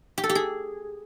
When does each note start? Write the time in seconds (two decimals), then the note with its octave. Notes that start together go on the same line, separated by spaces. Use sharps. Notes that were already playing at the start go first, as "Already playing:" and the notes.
0.18 G4
0.24 A4
0.29 G4
0.35 G#4